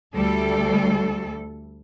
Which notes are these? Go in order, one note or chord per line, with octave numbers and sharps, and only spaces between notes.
D2 G3 A4